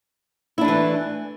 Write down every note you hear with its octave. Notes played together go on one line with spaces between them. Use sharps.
E3 A3 D4 E4